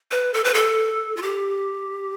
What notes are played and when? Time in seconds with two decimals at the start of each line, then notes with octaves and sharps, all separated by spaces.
0.11 B4
0.34 A4
0.44 B4
0.54 A4
1.17 F4
1.22 G4